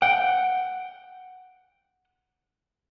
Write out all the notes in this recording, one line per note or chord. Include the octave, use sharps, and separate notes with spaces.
F#5 G5